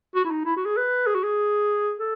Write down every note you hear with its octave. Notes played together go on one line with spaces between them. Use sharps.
F#4
E4
D#4
E4
F#4
G#4
B4
G#4
F#4
G#4
A4